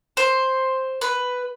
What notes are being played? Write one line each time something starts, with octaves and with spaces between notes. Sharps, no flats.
C5
B4